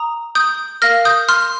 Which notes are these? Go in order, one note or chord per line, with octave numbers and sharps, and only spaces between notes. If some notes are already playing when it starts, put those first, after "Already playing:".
Already playing: A#5 D#6
D#6 G6
A#4 F5 F6 A#6
D#6 G6
C6 F6